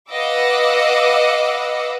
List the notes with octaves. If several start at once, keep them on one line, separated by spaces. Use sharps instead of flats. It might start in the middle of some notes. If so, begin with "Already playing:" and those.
B4 D#5 F5 F#5 D6 E6